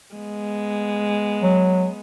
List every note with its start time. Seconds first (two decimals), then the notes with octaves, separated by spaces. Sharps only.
0.15 G#3 B3
1.43 F#3